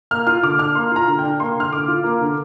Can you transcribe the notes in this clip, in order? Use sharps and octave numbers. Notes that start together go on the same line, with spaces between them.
A#3 F6
F4 F6
D3 D6
D4 F6
A#3 C6
F4 A#5
D3
D4 G5
A#3 C6
D3 F6
D3 D6
F4
A#3
D3